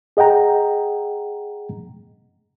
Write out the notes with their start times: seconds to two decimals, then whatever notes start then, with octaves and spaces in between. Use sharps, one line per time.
0.17 G#4 D#5 F#5 G5 A#5